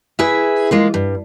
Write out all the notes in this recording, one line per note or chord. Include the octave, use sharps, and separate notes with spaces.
E4 G#4 B4 E5
G#3 A#3 F4
G2